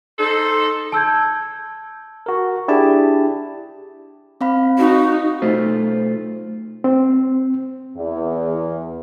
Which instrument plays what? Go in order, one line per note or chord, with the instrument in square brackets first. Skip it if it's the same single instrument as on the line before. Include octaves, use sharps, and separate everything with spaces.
[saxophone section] D#4 A4 [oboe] C5
[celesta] A5 E6 G6 G#6
[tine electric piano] F#4 A#4
D4 E4 G4 G#4 A5
[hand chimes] C4 F5 B5
[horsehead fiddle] D#4 [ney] F#4
[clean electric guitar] B1 A3 F4 C5
[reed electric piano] C4
[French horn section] E2